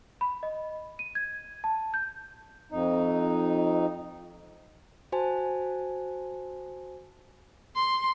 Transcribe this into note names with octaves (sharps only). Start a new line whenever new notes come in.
B5
D#5
D#7
G#6
A5
G6
F2 D#4
F#4 C5 G#5 A5
C6